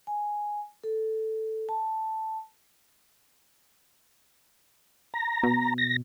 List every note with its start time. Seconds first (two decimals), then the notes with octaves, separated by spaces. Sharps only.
0.07 G#5
0.84 A4
1.69 A5
5.14 A#5
5.43 B2
5.78 A#6